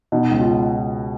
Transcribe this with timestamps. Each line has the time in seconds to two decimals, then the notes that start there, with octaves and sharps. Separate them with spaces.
0.12 B2 D#4
0.31 C#2
0.41 F4